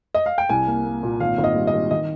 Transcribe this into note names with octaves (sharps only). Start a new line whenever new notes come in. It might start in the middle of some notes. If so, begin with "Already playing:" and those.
D#5
F5
G5
C2 G#5
A#3
A#3
A#2
G#1 F5
G#1
D#5
G3
D#5
G#1
D#3 D#5